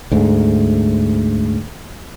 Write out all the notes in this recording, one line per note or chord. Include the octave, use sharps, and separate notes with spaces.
D2 G#2